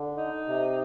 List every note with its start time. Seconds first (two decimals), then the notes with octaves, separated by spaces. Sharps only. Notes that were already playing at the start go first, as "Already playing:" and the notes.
Already playing: D3
0.17 D#4
0.47 C3